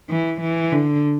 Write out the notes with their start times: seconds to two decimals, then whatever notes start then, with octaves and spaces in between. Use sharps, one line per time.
0.10 E3
0.41 E3
0.72 D3